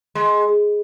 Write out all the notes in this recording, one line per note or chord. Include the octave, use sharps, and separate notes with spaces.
G#3